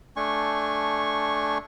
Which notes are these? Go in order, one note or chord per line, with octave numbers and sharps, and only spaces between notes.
A3 D4 G#5 C#6